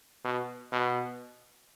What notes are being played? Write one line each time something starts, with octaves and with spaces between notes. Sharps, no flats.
B2
B2